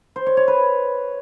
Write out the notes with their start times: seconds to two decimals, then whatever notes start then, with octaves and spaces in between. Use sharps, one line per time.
0.16 C5
0.26 C#5
0.37 C#5
0.48 B4